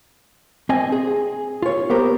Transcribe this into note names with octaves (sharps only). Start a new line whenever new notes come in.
C4 D#5 G#5
G#4
F4 C#5
B3 G4 A#4 C5